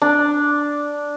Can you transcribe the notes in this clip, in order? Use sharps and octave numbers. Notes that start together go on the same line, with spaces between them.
D4